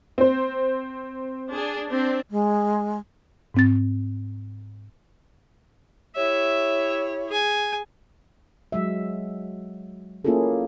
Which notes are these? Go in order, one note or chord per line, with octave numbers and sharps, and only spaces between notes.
C4 C5
D4 G#4
C4 D4
G#3
G#2 C4 A6
E4 G4 C#5 E5
G#4 G#5
F#3 G#3 E5
A#3 C#4 E4 F4 G#4 A4